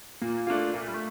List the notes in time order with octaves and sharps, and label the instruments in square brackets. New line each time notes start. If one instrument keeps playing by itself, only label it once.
[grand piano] A#2 [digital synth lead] A#3
[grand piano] A3 D4 F4 [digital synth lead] A#3
[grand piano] A#2 [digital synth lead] A#3
[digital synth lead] A3
G3
A3